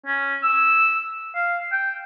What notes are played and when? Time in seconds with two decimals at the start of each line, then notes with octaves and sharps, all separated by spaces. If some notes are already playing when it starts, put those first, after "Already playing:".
0.06 C#4
0.43 E6
1.35 F5
1.72 G5